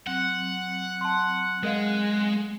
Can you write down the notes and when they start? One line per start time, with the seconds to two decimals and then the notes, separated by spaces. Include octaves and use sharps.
0.07 F#3 C4 F#5
1.01 A5 C6
1.63 G#3 A#4 D#5 F5